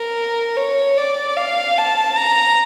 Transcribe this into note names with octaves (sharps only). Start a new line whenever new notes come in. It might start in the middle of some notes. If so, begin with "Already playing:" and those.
Already playing: A#4
C#5
D5
F5
A5
A#5